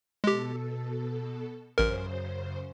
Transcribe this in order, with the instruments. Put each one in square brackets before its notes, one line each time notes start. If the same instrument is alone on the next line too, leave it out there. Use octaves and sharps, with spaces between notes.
[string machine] B2 A4 [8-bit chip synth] G#3 G4
[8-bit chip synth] A1 A#4 [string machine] F#2 C#3 C5